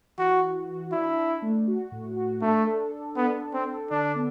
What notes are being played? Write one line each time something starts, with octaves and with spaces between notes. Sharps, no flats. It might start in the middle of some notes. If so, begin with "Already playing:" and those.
E3 F#4
F#4
F#4
D4 E4
D4
A3
F#4
A2
F#4
A3 D4
A4
A4
B3 D4
A4
C4
A4
D3 D4
B3